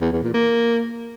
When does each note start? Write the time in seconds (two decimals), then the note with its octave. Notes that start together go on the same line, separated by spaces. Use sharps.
0.01 E2
0.12 E2
0.23 A#2
0.34 A#3